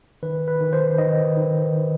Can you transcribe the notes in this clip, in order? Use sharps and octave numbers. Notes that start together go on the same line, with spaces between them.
D#3 B4
B4
D#3
C5
D#3 D#5
D#3